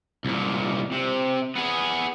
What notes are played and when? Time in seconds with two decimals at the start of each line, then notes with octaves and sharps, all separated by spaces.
0.25 C2 A#2
0.92 C3
1.56 B3 G#4